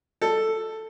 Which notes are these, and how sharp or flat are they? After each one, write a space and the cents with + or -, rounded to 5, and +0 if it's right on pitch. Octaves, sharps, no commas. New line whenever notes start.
A4 +5